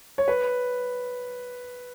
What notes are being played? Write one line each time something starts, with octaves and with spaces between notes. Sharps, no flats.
C#5
B4